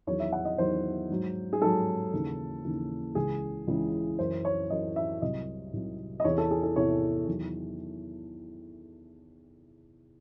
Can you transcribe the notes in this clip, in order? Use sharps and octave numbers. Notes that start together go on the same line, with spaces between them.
E2 D#3 F#3 C#5
E5
F#5
D#5
E2 D#3 F#3 C5
G#2 F#3
G#4
G#2 F#3 A4
D#2 C#3 E3
D#2 C#3 E3
C#2 C#3 E3 G#4
C#2 C#3 E3
F#2 E3 C5
C#5
F#2 E3 D#5
E5
C2 C3 F#3 D#5
C2 C3 F#3
D#5
E2 C3 E3 C#5
A4
G#4
A4
E2 C3 E3 C#5
E2 D#3 F#3